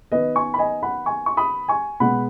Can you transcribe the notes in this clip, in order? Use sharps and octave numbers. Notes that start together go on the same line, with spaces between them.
D#3 B3 B4 D#5
G#5 C#6
B5
D#5 G#5
F#5 B5
G#5 C#6
C#6
B5 D#6
G#5 C#6
B2 G#3 B3 F#5 B5